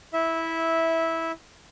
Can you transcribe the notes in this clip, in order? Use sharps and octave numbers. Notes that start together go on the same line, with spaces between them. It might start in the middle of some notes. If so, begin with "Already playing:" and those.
E4 E5